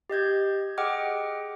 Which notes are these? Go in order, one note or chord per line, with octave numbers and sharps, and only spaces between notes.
G4 D#5 G6 G#6
G#4 D#5 F#5 G5 D6 F6